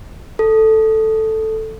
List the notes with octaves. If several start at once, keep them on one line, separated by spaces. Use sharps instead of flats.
A4